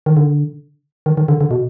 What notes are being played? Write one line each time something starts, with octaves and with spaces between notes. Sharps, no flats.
D#3
D3
D#3
D#3
D3
D3
B2